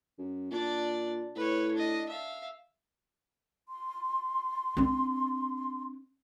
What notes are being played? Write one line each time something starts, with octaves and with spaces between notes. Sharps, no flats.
F#2
A#2 D4 D5
A2 B4 C#5
D4 D#5
E5 F5
C6
C4 D4